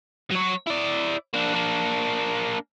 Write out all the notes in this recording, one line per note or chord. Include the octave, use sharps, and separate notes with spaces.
F#3 C#5
E4 D5
A#3 D4
A#3 D4